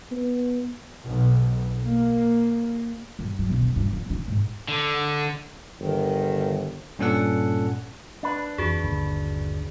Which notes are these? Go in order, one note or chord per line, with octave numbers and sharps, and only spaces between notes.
B3
B1
A#3
G2
F#3
B1
F#2
G2
F3
D#4
G#2
D3
G1 D#3
G2 A#2 C#4 D4 A4 F#5
D4 B4
F2 E3 F#4 G#4
G1 D#2 D3